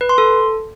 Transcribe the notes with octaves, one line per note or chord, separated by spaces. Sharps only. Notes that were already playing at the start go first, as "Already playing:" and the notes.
B4
C6
A4